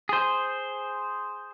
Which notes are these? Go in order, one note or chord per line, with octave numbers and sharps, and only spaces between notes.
G#4 C5